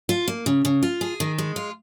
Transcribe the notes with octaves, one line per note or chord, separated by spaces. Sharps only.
F4
A#3
C#3
C#3
F4
G#4
D#3
G#3
F4